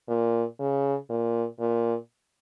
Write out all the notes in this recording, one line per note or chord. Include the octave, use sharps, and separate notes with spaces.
A#2
C#3
A#2
A#2